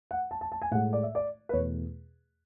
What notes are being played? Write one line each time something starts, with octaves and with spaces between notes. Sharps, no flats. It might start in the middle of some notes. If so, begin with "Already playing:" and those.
F#5
A5
A5
A5
G#5
A2 G#3 F#5
D5
E5
D5
B4
E2 B2 A3 C#5